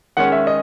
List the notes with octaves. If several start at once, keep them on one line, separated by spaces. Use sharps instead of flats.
D#3 G#3 C#4 F#5
E5
D#5